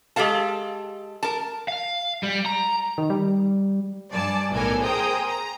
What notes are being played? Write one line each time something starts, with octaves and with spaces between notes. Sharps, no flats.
G#3 G4 A4 F5 A5
A#4 A5
F5
G3
A#5
D#3
G3
G2 D5 G#5 A5
B1 A2 E3 A4 A#4 G#5
G#4 A#4 C5 G5 A#5 D#6
A#5